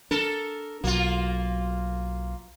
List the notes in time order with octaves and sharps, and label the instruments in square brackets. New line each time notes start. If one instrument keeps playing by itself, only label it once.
[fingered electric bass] D4 [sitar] A4 A#4
[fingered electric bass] B1 F#3 [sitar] A#3 F4